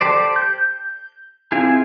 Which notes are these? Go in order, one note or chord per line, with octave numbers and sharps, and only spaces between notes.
G4 A4 C5 D5
G6
C4 E4 F4 G4 G#4